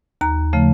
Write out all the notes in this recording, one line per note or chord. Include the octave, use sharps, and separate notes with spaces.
D#2 A#5
C#3 F3 A3